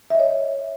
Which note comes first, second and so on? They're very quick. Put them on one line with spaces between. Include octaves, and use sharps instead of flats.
E5 D#5 C#5